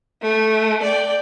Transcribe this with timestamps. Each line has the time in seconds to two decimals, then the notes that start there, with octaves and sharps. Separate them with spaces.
0.22 A3
0.82 D5 G5